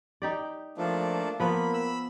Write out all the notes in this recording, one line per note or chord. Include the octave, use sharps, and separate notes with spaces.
D#4 G4 D5
F3 A3 A#3 D4
F3 A#3 B3 B5
B5 E6